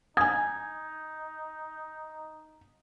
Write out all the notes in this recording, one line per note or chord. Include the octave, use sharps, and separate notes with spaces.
D#4 G#5 D#6 G#6